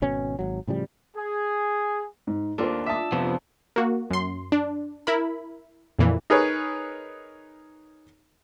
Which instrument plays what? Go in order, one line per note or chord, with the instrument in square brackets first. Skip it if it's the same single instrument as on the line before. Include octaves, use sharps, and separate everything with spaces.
[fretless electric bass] G#1 B2 C#4
G#1 F#3
A2 C#3 F3 G3
[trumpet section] G#4
[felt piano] G#2
[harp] D#2 D4 F4 [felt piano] A4 A#4 C5
[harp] E5 A5 [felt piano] D6 D#6
[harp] F2 [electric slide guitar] C3 F3 B3
[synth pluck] A#3 F#4
F#2 C6
D4
E4 A#4 B5
F2 A#2 E3
[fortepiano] D#4 G#4 A#4 B4 C#5